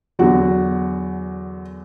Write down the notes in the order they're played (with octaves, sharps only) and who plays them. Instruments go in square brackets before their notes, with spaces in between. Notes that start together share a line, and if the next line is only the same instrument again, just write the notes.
[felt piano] E2 D3 F#3 F#4